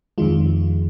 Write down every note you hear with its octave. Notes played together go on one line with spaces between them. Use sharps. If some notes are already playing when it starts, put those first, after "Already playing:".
F2 D#3 G#3 F4